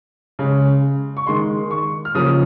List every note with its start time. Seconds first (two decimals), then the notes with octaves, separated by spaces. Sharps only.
0.39 C#3 G#3
1.17 C#6
1.27 D#3 G#3 C6
1.71 C#6
2.05 F6
2.15 C#3 F3 A#3 D#6